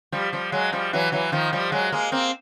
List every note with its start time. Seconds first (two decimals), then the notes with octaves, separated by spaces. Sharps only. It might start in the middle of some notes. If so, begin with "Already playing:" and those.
0.12 F3 G3
0.32 F3 G3
0.52 F#3 G#3
0.73 F3 G3
0.93 E3 F#3
1.12 E3 F#3
1.32 D#3 F3
1.53 F3 G3
1.72 F#3 G#3
1.92 G#3 A#3
2.12 A#3 C4